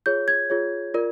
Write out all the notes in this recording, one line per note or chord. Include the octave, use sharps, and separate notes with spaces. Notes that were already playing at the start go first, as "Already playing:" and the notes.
F4 G#4 C#5 G6
G#6
F4 G#4 C#5
F4 A#4 D5